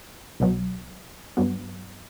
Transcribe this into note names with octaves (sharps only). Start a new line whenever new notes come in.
C2 B2 F#3
G2 F#3 B3